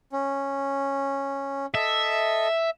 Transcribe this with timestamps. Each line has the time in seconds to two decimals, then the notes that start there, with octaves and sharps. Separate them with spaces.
0.12 C#4
1.74 A4 D#5 E5